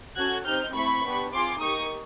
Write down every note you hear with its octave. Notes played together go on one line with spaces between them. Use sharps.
C#4 F#4 A4 F#6 G#6
C4 D#4 G4 F6 G6
A3 C4 E4 B5 C#6
B3 D4 G4
C4 F4 G#4 C6 D6
A#3 D#4 G4 C#6 D#6